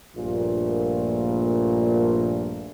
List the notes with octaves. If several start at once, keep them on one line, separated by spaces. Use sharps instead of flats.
A#1 G2 A#2 A3 A#3 F4